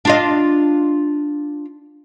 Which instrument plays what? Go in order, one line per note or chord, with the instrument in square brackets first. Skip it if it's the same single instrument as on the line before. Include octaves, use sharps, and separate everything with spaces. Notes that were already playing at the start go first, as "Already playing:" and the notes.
[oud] D4 F4 D#5